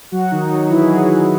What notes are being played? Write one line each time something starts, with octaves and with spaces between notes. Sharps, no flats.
F#3 F#4
D#3 D#4
F#3 F#4
E3 E4
G#4
F#3 F#4
F#3 F#4